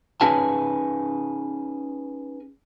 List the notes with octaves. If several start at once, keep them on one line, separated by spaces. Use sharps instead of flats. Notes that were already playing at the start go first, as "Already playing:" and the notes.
C#4 D#4 G#4 B4 G#5 A5